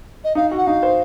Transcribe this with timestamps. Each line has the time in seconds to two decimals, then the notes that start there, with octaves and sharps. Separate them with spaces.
0.24 D#5
0.35 D#4 F5
0.51 F#4
0.57 F#5
0.67 D#4 F5
0.83 C5